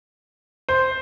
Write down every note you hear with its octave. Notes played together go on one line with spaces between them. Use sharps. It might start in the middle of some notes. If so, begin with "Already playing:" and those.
C5